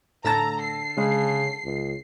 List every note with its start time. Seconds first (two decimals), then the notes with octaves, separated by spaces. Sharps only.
0.24 A2 D3 A5 A#5 E6 A6 A#6
0.61 C7
0.97 C#3 G#3
1.64 C#2